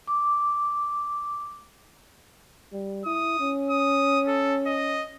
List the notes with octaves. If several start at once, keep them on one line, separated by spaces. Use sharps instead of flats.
D6
G3
E4 D#6
C#4
D#6
A4
D#5